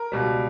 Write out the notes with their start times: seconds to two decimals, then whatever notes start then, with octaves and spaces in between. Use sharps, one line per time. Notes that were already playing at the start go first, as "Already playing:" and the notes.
Already playing: A#4
0.12 C#2 B2 G3